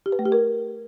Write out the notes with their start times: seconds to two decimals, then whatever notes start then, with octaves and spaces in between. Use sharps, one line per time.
0.06 G4
0.12 B4
0.19 A3
0.26 G4
0.32 A#4